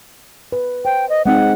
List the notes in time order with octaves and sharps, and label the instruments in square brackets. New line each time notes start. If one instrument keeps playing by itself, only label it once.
[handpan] B4
[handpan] C5 [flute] G5
[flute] D#5
[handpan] G#3 C4 D#4 [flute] F#5